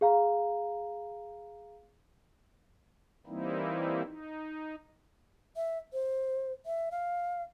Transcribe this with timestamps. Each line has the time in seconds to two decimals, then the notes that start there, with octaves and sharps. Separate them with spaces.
0.01 G#4 F5 A#5
3.27 E3 G3 A#3 C4 D#4 E4
4.03 D#4
5.56 E5
5.93 C5
6.66 E5
6.91 F5